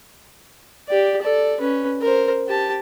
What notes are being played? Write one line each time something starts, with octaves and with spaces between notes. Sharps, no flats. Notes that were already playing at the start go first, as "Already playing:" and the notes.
G4 D5
A4 D5
C#4 B4
A#4 C5
G4 A5